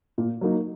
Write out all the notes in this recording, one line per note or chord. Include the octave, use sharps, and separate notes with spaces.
A#2
F#3 A#3 D#4